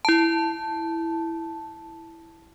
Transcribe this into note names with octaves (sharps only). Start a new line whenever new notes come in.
E4 A5